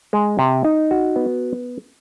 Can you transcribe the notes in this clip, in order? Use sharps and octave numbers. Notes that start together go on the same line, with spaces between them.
G#3
C3
D#4
F#4
B3